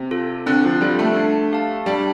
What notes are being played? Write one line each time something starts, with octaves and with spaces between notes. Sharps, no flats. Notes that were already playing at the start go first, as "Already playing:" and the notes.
Already playing: C3
F4 A4
D3 C4
F3
G3 F4 A4
A3
D4
G4 F5 A5
G3 D4